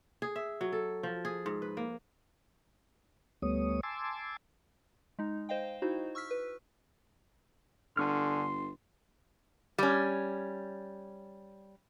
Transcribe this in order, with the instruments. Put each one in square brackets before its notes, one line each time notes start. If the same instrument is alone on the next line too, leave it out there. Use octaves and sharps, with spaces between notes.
[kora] G#4
E5
F#3
A4
F3
G#4
G#2
B4
A#3
[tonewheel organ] D2 G3 A3 B3 C#5 D#6
G#5 A5 C6 D6 E6
[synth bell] G#3 D#4
C5 D#5 F5 G5
D#4 E4 F#4 C5
C#6 E6 F6 B6
B4
[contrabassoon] G1 [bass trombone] D3 [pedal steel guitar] G#5 C#6 F6 [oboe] C6
[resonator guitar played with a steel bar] G3 C#4